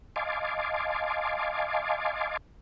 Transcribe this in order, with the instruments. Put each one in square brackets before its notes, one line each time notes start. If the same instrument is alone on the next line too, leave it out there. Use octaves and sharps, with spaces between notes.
[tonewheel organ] D#5 F5 G#5 A5 C6 D6